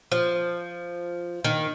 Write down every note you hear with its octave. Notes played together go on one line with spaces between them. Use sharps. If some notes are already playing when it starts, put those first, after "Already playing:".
F3
D#3